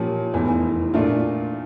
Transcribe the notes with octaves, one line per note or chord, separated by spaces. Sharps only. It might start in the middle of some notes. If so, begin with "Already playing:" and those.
Already playing: A#2 F3 C#4 G4
F1 E2 E3
A#2 A3 D4 F4